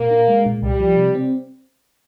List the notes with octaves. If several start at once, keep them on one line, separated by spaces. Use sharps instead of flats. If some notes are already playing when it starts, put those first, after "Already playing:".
Already playing: A#2 A#3
D4
G#3
A#2
C2 G3
F3
C3
C4